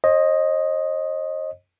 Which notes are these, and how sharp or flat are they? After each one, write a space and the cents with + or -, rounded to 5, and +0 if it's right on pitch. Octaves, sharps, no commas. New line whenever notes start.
C5 +45 D#5 +0